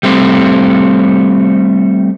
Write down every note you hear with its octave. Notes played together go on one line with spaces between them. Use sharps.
G3 A3 C4